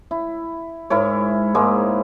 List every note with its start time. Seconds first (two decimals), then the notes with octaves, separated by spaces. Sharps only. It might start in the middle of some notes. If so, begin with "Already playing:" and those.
0.11 E4
0.90 G#2 E4 A#4 C#5
1.55 G#2 G#3 A#3